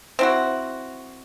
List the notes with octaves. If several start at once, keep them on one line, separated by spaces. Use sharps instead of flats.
C4 E4 F#4